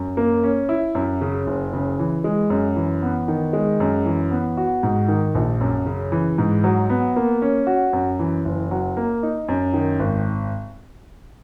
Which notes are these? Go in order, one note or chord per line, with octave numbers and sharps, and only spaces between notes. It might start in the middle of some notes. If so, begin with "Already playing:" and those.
Already playing: F#2
A#3
C#4
E4
F#2
C#3
F#1
C#3
E3
G#3
F#2
E3
B3
D#3
G#3
F#2
E3
B3
F#4
G#2
D#3
A#1
F#2
C#3
E3
G#2
F#3
B3
A#3
C#4
F#4
F#2
E3
F#1
F#3
A#3
D#4
F#2
D#3
G#1